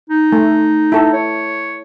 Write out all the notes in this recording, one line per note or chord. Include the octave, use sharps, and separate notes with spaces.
D#4
A3
E4 A4
C#5